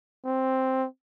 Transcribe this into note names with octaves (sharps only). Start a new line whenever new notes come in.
C4